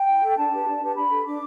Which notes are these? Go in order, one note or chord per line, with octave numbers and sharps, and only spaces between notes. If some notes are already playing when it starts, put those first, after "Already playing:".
Already playing: G5
E4
A4
D4 A5
G4 B4
D4
G4 B4 A5
D4 B5
A4
D4 D6